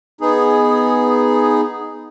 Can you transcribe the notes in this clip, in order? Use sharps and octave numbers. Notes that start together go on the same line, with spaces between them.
B3 D#4 G#4